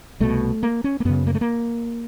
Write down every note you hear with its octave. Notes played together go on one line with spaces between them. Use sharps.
C2 B2 A3
A#3
C#4
A#3
F#2 C#3 B3
A#3
A3
A#3